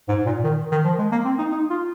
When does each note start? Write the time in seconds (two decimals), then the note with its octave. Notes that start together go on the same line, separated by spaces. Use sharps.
0.09 G#2
0.26 A#2
0.44 D#3
0.72 D#3
0.85 F3
0.99 G#3
1.12 A#3
1.25 C4
1.39 D#4
1.52 D#4
1.71 F4